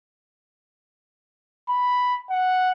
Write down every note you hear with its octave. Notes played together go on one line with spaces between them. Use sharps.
B5
F#5